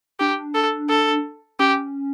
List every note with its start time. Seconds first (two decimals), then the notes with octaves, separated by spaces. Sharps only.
0.20 D4 G4
0.55 A4
0.89 A4
1.59 C#4 G4